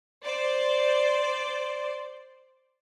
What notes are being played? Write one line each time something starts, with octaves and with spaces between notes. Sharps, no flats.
C5 D5